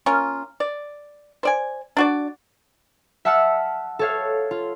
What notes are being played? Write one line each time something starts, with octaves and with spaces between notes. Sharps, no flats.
A#3 C#4 F4
D5
C5 D5 G#5
D4 F#4 D5
E5 F#5 A5 E6 F6 C#7
A4 C#5 F5
F4